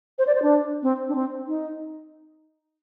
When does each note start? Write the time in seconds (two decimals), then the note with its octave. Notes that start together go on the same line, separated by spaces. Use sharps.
0.18 C5
0.27 D5
0.35 C5
0.42 D4
0.83 C4
1.08 D4
1.15 C4
1.47 D#4